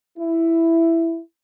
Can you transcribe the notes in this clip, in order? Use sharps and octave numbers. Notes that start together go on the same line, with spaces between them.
E4